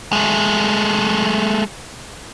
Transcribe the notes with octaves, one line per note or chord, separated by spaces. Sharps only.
G#3 A3